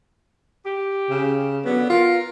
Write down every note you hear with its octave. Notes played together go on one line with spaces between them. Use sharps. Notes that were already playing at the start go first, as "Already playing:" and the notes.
G4
C#3
D3 F#3 B3
F4 A#4